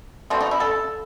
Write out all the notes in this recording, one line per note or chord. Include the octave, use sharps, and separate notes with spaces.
B2 A3 C4
D#4
E4
A4